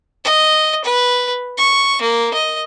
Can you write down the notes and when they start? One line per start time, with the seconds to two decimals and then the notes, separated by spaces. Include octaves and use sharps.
0.25 D#5
0.85 B4
1.58 C#6
2.01 A#3
2.34 D#5